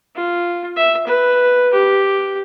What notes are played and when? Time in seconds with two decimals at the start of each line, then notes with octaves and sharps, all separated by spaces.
0.15 F4
0.76 E5
1.07 B4
1.73 G4